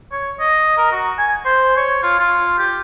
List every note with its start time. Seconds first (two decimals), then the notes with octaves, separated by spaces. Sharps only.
0.12 C#5
0.40 D#5
0.78 A#4
0.92 F#4
1.18 G#5
1.45 C5
1.77 C#5
2.03 F4
2.19 F4
2.58 G4